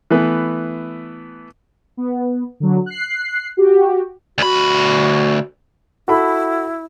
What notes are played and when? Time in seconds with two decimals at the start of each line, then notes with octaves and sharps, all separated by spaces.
0.10 E3 A3 B3
1.97 B3
2.60 D3 F#3
2.86 F#6 C7
3.57 F#4 G4
4.38 D2 F#4 B5
6.08 E4 F#4 A4 B5